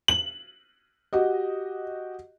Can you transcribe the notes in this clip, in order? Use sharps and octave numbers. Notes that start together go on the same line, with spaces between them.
F#7
F#4 G4 D#5